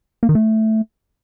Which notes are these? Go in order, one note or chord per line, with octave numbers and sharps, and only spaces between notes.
A#3
D#3
A3